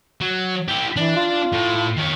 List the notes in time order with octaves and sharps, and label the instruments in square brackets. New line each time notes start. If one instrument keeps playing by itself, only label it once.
[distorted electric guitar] F#3
E4 G4
[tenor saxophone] E3 [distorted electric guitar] D4
[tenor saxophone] F4
[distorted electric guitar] A2
D#3 C#5